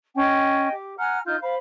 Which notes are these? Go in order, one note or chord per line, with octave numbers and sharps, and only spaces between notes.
C#4 D#5 G5 G#5
G4
F#5 G#5 A#5 F6
D#4 F4 F6 G6
C5 F5 B5